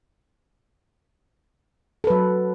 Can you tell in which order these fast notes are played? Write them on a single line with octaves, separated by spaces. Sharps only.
A4 B4 F#3